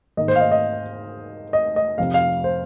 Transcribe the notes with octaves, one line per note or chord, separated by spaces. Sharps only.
G#2 D#3 A#3 D#4 D#5
C5
F5
D#5
D#5
D#5
D#5
F2 C3 F3 C4 F5
F5
C5